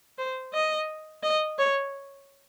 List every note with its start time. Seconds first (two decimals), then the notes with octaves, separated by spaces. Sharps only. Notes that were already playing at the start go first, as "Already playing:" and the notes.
0.18 C5
0.54 D#5
1.23 D#5
1.58 C#5